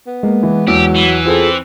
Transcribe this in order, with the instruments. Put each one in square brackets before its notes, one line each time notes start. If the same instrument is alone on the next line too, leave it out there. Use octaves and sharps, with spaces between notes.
[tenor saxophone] B3
[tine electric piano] G#3 [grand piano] A#3
[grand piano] E3
[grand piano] E2 E6 [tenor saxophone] F#3 [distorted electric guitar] G4
[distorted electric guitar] E3
[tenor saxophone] C4 [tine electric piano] F4 G#4 A4